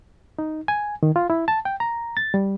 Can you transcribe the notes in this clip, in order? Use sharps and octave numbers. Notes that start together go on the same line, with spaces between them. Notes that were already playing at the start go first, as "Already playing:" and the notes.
D#4
G#5
D#3
F4
E4
A5
G5
A#5
A6
G3